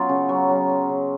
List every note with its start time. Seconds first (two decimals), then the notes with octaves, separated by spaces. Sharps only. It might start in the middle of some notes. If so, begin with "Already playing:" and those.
Already playing: F#3 B3 C#4 F4
0.09 C#3
0.29 F#3
0.49 F#3
0.70 F#3
0.89 C#3